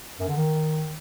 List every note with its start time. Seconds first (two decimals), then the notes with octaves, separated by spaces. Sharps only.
0.20 F#2
0.28 D3
0.36 D#3